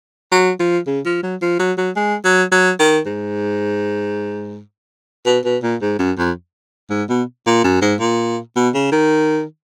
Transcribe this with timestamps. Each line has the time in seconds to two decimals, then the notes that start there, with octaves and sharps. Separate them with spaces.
0.32 F#3
0.59 F3
0.87 C#3
1.06 F3
1.23 F#3
1.42 F3
1.59 F#3
1.78 F#3
1.96 G#3
2.24 F#3
2.52 F#3
2.79 D#3
3.06 G#2
5.26 B2
5.45 B2
5.63 A#2
5.81 G#2
5.99 F#2
6.18 F2
6.90 G#2
7.09 B2
7.46 A#2
7.64 F#2
7.82 G#2
8.00 A#2
8.56 B2
8.74 C#3
8.92 D#3